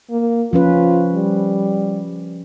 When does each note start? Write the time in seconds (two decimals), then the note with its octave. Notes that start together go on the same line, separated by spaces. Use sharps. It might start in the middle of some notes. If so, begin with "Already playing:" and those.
0.11 A#3
0.53 F3 C#4 F4 B4
1.15 G3